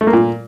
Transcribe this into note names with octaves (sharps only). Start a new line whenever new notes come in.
A3
A#3
A#2